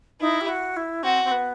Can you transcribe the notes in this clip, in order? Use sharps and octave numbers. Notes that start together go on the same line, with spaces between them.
D#4 E4
G4
F#4
E4
C4 F#4
C4
B3